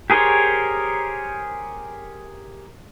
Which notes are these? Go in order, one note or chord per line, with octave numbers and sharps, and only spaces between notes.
G4 G#4 A#4 C5 C#5